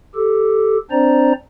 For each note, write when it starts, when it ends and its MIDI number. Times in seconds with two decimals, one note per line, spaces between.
0.15 0.77 67
0.15 0.77 69
0.91 1.33 60
0.91 1.33 62
0.91 1.33 72
0.91 1.33 74
0.91 1.33 82